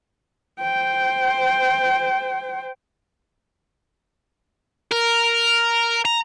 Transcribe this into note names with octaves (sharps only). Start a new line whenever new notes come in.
C5 G5
A#4
A#5